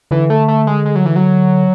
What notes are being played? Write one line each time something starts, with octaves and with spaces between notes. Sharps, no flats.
D3 E3
A3
A3
G#3
G#3
F#3
E3
F#3